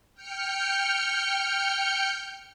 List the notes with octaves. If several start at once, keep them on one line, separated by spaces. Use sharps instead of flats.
G5 F6 G6 C#7